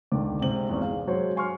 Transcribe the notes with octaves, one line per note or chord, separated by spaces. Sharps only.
E1 C#2 D3 D#3 D5 D6
G#2 C3 F#7
G#1 E2 G#2
G#4 F5
F#3 G#3 F#4 C5 C#5
G#5 C6 C#6 F6